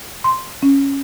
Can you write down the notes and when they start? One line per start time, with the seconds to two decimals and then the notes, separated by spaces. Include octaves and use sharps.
0.24 C6
0.63 C#4